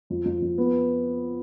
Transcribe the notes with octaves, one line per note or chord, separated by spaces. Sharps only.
F2
F2
F2
B3